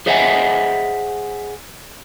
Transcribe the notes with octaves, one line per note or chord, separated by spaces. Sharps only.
G#4 C5 D#5 E5 F#5 G#5